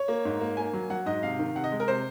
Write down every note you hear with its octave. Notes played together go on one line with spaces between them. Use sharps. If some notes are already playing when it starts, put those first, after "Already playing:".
Already playing: C#5
A#3
G#2
A#3
A#3 G#5
F#3
F#3 F#5
G#2 D#5
C3 F5
D#3
C3 F#5
D#5
G#3
A#4
C3 C5